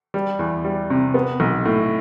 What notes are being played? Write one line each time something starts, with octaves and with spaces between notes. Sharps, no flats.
G3
E2
G3
C3
B3
B1
A2